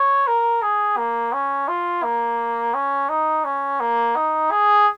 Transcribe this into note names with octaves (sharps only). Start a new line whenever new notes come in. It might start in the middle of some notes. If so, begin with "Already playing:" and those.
Already playing: C#5
A#4
G#4
A#3
C#4
F4
A#3
C#4
D#4
C#4
A#3
D#4
G#4